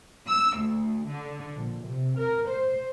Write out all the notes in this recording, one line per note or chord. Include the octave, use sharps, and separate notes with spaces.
E6
D2
D3
A#1
C3
A#4
C5